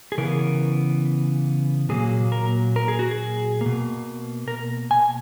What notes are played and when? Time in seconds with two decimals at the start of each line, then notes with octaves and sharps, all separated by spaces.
0.12 G#4
0.18 C#3 E3 B3 A#4
1.89 A#2 F#3 A#3 G#4
2.32 A#4
2.76 A#4
2.88 G#4
2.99 F#4
3.11 G#4
3.61 B2 A#3
4.48 A#4
4.91 G#5